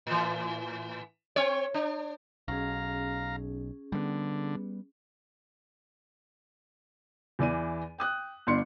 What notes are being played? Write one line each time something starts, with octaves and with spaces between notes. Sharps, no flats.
A2 E3
C4 C#5
D4
B1 C#4 G#4 F5 A#5
D3 G3 A3 B3
E2 E3 D5 D#7
G5 D#6 F#6
G1 D4 C6 C#7